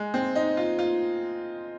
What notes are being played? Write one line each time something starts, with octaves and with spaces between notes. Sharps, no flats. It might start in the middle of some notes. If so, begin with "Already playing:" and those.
Already playing: G#3
C4
D#4
F4
F4